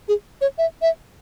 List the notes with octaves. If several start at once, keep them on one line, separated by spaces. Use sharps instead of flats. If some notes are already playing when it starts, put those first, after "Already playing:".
G#4
C#5
E5
E5